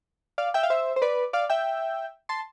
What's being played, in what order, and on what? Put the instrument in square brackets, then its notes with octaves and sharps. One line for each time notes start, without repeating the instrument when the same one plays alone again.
[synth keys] D5 F5
E5 G5
F5
C5 E5
C5
B4 D5
D5 F5
E5 G5
A5 C6